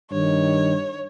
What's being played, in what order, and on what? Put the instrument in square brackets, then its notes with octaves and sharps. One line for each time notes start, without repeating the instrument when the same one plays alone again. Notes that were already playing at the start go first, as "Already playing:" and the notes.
[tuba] G2 [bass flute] D#3 [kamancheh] C#5